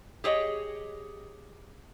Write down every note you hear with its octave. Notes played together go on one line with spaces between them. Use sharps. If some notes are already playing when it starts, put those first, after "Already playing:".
G4 G#4 C#5 D#5